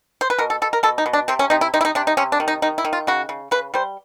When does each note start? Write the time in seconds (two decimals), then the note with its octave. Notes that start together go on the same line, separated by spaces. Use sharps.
0.21 C5
0.30 B4
0.39 B2 A#4
0.50 A4
0.62 B2 A4
0.73 A#4
0.83 B2 A4
0.98 D#4
1.06 B2
1.13 D4
1.28 C3 C4
1.39 C#4
1.50 C3 D#4
1.61 E4
1.74 C3 D#4
1.81 E4
1.85 D#4
1.95 C3 D4
2.07 D#4
2.17 C3 C#4
2.32 D4
2.40 D#3
2.48 D#4
2.62 D#3 D#4
2.78 E4
2.85 D#3
2.93 F4
3.07 C#3 F#4
3.29 C#3
3.51 C#3 B4
3.74 G3 C5